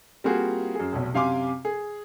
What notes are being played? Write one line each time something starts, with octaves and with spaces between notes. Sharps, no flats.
G3 A#3 C4 F4 F#4 G#4
F#2 G#4
F1 B1
F#2 C3 F5 G#5 C6 D6
G#4